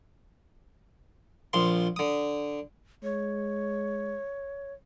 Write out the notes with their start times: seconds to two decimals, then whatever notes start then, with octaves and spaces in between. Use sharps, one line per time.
1.53 A#1 F3 C6
1.96 D3 D#6
3.03 G#3 C#5